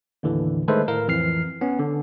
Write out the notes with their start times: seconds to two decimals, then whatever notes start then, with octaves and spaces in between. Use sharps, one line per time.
0.23 D#2 A2 D3 E3
0.68 D#3 G#3 A3 A4 B4 C5
0.88 A2 A#4 F5
1.07 A1 F2 E3 F6 C7
1.61 B3 C#4
1.79 D3